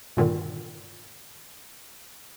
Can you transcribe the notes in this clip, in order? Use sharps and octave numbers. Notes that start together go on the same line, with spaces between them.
G2 A#2 D3 D#3